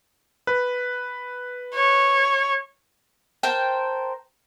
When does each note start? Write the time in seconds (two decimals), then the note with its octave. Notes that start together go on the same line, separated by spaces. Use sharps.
0.47 B4
1.74 C#5
3.43 A#4 C5 G5 A5